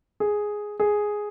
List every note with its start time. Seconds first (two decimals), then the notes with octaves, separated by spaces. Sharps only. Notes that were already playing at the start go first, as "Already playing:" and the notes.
0.20 G#4
0.80 G#4